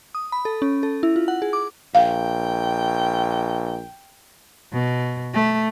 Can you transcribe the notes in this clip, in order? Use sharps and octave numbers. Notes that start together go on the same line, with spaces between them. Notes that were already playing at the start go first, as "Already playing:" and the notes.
D#6
B5
A4
C#4
A4
E4
F4
F#5
G#4
D6
A#1 F5 G5
B2
A3